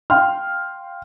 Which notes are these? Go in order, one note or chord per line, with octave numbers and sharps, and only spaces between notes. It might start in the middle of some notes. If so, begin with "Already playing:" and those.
F5 G5 C6 F6